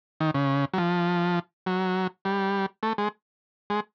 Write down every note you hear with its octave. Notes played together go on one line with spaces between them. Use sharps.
D#3
C#3
F#3
F3
F#3
G3
A3
G#3
G#3